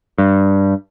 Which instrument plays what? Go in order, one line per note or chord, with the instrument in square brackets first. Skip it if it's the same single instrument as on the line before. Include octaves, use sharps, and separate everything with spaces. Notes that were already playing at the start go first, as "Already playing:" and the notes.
[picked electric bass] G2